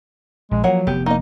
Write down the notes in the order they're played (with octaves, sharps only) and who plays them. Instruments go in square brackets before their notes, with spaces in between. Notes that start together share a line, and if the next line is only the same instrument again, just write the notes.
[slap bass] A#1 [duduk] G#3
[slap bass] F3 [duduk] F#3 [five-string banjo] A#3 C#5 F#5
[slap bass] F1 B3 [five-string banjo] G4
[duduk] A#3 [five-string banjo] D#4 D#5